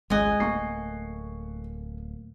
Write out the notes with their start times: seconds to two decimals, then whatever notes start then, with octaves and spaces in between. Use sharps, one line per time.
0.10 G#1 C#2 G#3 D#5 G#5 F#6
0.40 D1 A3 A#3 C#6 C7